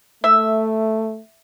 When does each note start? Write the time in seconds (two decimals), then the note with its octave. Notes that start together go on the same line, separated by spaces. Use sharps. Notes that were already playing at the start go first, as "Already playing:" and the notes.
0.24 A3 E5